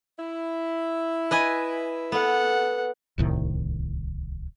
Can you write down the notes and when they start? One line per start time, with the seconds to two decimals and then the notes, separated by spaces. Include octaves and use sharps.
0.18 E4
1.31 B4 D#5 G#5
2.12 B3 A4 F#5
3.18 D1 C2 A2 D#3